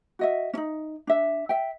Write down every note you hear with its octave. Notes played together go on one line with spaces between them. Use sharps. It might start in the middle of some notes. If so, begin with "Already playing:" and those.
F#4 D#5 E5
C#4 D#4
D4 E5
E5 G5